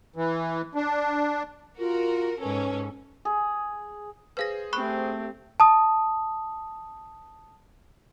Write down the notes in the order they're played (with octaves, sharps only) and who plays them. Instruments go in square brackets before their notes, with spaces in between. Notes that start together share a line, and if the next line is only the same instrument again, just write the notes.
[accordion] E3
D4
[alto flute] F4 [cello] F#4 [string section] A#4
[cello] G#2 A4 [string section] C#4 [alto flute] B4
[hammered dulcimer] G#4
[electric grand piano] G#4 C5 [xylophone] B4 F5 A#6
[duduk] A3 [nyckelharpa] C4 G4 [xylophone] B5 C#6 F#6
[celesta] A5 D#6